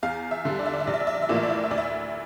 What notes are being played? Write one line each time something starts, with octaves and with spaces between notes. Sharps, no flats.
E2 F5
E5
D3 G3
D5
E5
D5
E5
A#1 D5
E5
D5
E5
D5
E5
A2 E3 A#3 F4 D5
E5
D5
E5
D5
E5
D2 D5
E5
D5